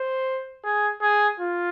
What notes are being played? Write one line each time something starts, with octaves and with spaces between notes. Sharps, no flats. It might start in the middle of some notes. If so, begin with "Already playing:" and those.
Already playing: C5
G#4
G#4
F4